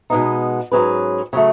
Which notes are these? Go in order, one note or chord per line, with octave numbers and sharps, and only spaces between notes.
B2 G#3 B3 D#4
G#2 F#3 C#4 G#4 B4
C#3 F#3 A3